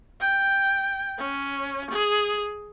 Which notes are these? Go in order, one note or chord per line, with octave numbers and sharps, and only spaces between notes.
G5
C#4
G#4